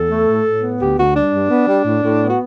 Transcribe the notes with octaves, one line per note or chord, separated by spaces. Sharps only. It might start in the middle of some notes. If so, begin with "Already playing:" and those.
Already playing: E2 A4
A3
A2
A2
B3
D2 G4
D2 F#4
G3 D4
G2
B3
G3
A2
A2
B3
F#4